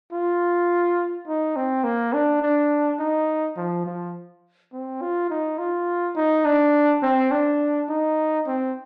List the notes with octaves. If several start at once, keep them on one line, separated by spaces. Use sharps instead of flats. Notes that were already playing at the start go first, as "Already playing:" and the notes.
F4
D#4
C4
A#3
D4
D4
D#4
F3
F3
C4
F4
D#4
F4
D#4
D4
C4
D4
D#4
C4